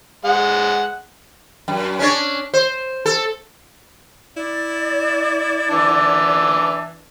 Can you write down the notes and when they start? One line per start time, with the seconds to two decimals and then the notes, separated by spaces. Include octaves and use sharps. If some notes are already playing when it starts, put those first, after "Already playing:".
0.25 G#3 F#5
1.68 F#2
1.99 C#4 D4 C#5
2.54 C5
3.06 A4
4.37 E4 D5
5.71 E3 D4